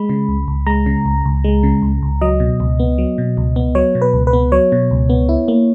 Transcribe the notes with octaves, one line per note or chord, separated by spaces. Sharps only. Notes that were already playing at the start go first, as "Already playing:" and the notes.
Already playing: G#3 B5
C#3
C#2
C#2
G#3 A#5
C#3
C#2
C#2
G#3
C#3
C#2
C#2
F#3 D#5
B2
C#2
B3
F#3
B2
C#2
B3
F#3 C#5
B2
B4
C#2
B4
B3
F#3 C#5
B2
C#2
B3
E4
A#3